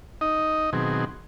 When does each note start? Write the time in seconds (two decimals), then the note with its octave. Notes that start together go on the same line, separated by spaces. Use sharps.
0.21 D#4 D#5
0.73 B2 D#3 F#3 C4 G#4